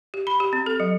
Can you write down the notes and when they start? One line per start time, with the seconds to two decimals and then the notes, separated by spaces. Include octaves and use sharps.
0.14 G4
0.27 B5
0.40 G4
0.53 C4
0.66 A4
0.80 F#3